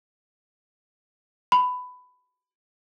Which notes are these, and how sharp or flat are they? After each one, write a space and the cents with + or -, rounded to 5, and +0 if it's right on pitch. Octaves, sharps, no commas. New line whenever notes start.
B5 +15